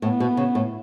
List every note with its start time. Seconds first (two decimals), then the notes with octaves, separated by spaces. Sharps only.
0.02 A2 B3
0.20 B2
0.37 C#3
0.55 A2